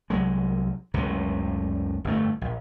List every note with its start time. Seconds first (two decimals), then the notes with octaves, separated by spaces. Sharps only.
0.10 C2 F#3 G#3
0.94 F#1 C#2 A2 C3
2.05 G1 F2 A3
2.41 A#1